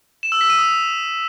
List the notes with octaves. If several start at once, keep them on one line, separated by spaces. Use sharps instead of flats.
E7
E6
B6
D#7
D#6